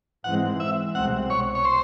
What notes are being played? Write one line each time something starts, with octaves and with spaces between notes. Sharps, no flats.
G#2 E3 G#3 C4 F#5
E5
C2 B2 G#3 C4 F#5
C#5
C#5
C5